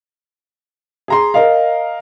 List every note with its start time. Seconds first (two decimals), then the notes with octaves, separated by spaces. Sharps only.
1.08 G#4 A#5 C6
1.34 A#4 D#5 F5